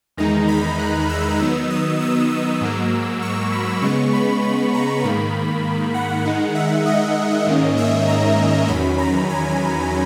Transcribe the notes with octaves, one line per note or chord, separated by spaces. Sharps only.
E2 D#3 G#3 D#4 A#5
B5
F#6
E6
D#3 F#3 B3 D#4 E6
D#6
E6
E6
G#2 F#3 A#3
C#6
B5
C#3 G#3 B3 C#6
B5
B5
A#5
G#2 D#3 A#3 B5
F#5
D#3 G#3 D#4
E5
D#5
G#2 D#3 A#3 C#4
E5
A#5
E2 D#3 F#3 C#4 B5
A#5
G#5